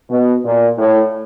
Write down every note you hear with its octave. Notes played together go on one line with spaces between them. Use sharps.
B2
A#2
A2